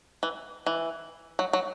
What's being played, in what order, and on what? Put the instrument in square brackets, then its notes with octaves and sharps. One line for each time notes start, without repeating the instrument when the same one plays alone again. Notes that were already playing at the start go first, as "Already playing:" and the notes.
[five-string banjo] E3
E3
F#3
F#3